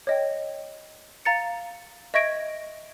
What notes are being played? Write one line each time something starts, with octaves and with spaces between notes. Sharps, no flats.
C#5 D#5 G5
F5 A#5 A6 C#7
D#5 E5 C#6 G#6 A#6 D7